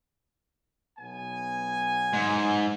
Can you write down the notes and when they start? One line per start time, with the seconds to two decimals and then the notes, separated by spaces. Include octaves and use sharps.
0.99 B1 B3 G#5
2.13 G#2